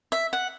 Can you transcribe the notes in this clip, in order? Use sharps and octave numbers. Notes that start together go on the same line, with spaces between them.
E5
F#5